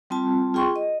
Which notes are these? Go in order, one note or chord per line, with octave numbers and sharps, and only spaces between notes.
G3 C4 F4 A5
F4 G#4 G5 C6 C#6
D#5